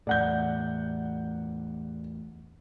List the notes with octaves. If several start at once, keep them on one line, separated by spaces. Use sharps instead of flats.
E2 A2 D5 F#5 G6